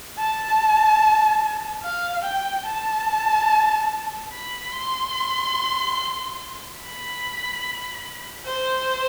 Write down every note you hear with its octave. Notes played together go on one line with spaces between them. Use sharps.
A5
F5
G5
A5
B5
C6
B5
C5